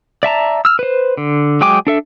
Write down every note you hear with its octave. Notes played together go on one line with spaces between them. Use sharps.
D5 E5 A5 A#5
E6 F6
B4 C5
D3
F#3 G#3 G5 G#5 D6
D4 A4 E5